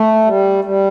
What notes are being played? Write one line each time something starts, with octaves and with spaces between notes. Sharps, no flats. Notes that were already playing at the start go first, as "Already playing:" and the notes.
Already playing: A3
G3
G3